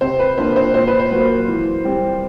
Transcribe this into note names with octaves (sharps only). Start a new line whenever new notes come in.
C3 C5
B4
F3 A#3 D4 C5
C5
A#2 C5
B4
C5
F#3 A#3
E3
G3 C4